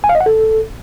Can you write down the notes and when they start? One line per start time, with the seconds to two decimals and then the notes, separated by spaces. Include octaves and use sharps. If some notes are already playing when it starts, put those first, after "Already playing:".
0.04 G#5
0.09 F5
0.15 D#5
0.21 F#5
0.26 A4